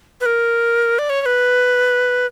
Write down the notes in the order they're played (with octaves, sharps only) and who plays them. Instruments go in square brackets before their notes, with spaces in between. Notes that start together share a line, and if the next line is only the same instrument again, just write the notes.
[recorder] B4
A#4
D5
C#5
C#5
B4